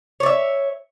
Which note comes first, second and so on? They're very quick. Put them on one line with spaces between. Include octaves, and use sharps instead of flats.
C#5 D5 E5